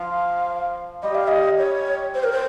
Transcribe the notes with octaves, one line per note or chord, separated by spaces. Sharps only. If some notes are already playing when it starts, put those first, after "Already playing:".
Already playing: F3 F5
G3 D#5
F5
D#5
C#5
C5
A#4
C5